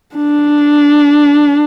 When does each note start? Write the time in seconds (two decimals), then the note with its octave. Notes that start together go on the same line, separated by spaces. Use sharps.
0.16 D4